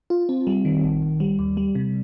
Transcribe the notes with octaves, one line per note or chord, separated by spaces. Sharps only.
F4
C4
G3
D#3
A#1
A#1
G3
D#2
G3
C3